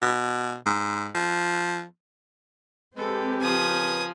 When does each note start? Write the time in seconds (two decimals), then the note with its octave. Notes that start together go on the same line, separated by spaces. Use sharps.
0.02 B2
0.66 G#2
1.15 F3
2.97 G#3 C4 G4 A4 B4
3.41 C#3 F3 A#4 B4 G#5 D#6